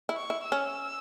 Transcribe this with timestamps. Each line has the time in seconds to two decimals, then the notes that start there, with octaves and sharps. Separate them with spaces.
0.09 E4
0.16 C#6
0.30 E4
0.44 E6
0.52 C#4